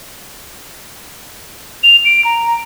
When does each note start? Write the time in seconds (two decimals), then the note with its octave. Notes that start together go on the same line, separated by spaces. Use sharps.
1.83 F7
2.05 D7
2.25 A#5